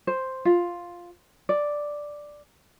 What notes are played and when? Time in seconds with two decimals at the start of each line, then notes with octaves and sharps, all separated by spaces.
0.07 C5
0.45 F4
1.49 D5